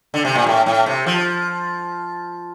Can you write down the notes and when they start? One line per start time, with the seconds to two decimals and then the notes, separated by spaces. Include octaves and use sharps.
0.14 D3
0.25 C3
0.35 A#2
0.47 A2
0.66 A2
0.86 C3
1.06 F3